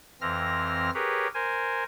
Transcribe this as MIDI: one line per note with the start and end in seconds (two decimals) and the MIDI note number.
0.21 0.90 41
0.21 0.90 52
0.21 0.90 60
0.21 0.90 89
0.21 0.90 94
0.94 1.28 67
0.94 1.28 68
0.94 1.28 70
0.94 1.28 71
0.94 1.28 73
1.34 1.84 70
1.34 1.84 72
1.34 1.84 80